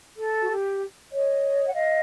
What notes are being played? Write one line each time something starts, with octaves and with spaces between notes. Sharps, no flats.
A4
F#4
G4
C#5 D#5
F#5
D#5 F5